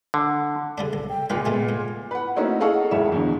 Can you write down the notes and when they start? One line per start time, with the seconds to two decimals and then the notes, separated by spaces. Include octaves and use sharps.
0.14 D3
0.78 C#3 G3 D4 A4
0.93 B1
1.09 G5
1.30 C#2 A#2 G#3 F4 B4 G#5 A#5
1.46 B2 A3 B3 A5
1.69 G#2
2.11 B4 F#5
2.36 A3 A#3 C4 C#4 D#4 F#4
2.60 G#4 A4 D#5 F5 F#5 C#6
2.91 E1 C#2 C#3 C#5 E5 E7
3.12 E2 B2 D3